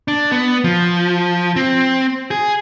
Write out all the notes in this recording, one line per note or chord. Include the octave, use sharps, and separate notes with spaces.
D4
B3
F3
C4
G#4